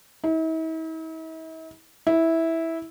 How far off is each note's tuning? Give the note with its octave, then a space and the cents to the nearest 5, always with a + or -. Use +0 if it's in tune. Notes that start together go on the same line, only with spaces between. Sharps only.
E4 -45
E4 -10